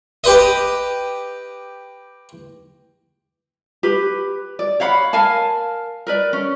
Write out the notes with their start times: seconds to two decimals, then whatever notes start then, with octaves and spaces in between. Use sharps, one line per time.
0.24 G4 B4 D#5
3.83 G4 B4
4.59 D5
4.80 C#5 F5 F#5 B5
5.13 A#4 F5 G#5 A5
6.07 A#4 B4 D5
6.33 C#4